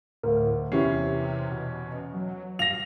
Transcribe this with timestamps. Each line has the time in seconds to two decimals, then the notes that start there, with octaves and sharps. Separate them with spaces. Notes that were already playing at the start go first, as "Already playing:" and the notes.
0.23 D2 A2 A#4 F5
0.72 E2 C3 C#4 E4 G4 E5 C7
1.51 B2
2.14 F#3
2.59 G2 F5 A#6 F7